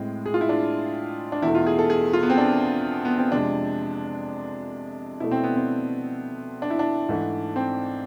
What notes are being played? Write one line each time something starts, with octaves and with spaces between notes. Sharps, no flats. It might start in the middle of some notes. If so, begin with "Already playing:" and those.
Already playing: A2 G#3 C4
G#4
F4
E4
D4
D4
E2 B2 A3 E4
F4
G#4
A4
G#4
F4
B3
C4
D4
B3
C4
F2 C3 G#3 D4
B2 A3 E4
C4
B3
C4
D4
E4
D4
G#2 E3 A3
C4